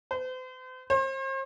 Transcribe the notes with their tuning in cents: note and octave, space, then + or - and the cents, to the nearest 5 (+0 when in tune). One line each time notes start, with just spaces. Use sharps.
C5 -40
C5 +40